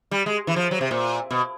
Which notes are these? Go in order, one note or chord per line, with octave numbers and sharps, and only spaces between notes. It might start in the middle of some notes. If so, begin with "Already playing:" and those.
G3
G#3
E3
F3
F#3
C3
A#2
B2